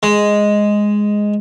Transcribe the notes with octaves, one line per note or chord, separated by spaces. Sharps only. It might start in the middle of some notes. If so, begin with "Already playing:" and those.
G#3